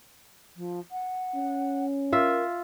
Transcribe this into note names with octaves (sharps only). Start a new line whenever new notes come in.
F3
F#5
C#4
F4 A#4 E5